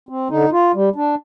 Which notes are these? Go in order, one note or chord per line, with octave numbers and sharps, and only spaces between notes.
C4
D3 D#4
F4
G3
D4